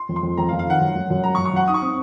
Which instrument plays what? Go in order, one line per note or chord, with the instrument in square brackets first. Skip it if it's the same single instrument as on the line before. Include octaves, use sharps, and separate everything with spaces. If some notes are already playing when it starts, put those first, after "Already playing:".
Already playing: [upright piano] C6
[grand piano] F2
[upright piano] C6
[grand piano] F2
[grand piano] F2 [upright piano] A#5
[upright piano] F5
[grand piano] F2
[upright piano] F5
[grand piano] D#3 [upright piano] F#5
[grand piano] F#2
F#2
F#2
[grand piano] F#2 [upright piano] A#5
[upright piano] C#6
[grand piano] F#2
[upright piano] C#6
[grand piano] F#2 [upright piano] F#5
[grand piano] D#4 [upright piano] D#6
[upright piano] C#6
[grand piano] C4 [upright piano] D#6